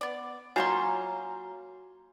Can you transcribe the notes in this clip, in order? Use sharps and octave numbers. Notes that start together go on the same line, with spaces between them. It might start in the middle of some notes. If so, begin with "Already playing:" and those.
B3 D5
F#3 A#3 C#4 F4 F#4 G#5 A#5 C6